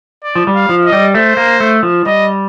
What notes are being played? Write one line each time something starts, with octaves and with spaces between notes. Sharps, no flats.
D5
F3
G3
F5
F3
D#5
G3
A3 C5
A#3
A3
F3
G3 D#5